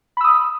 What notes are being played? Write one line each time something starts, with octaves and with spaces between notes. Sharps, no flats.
B5 D#6 E6